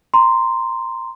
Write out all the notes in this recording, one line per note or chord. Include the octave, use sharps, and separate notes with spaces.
A#5 C6